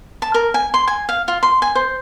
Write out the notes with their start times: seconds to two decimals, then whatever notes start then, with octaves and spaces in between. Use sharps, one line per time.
0.22 A5
0.34 A#4
0.54 G#5
0.74 C6
0.88 G#5
1.09 F5
1.28 F4
1.43 C6
1.62 G#5
1.75 C5